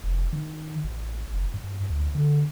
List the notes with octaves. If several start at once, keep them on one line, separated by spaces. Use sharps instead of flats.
F1
D#3
A1
F#1
G2
D2
D3